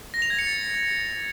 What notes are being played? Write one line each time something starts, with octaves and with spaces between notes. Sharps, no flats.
A#6
F7
G#6
C#7
A6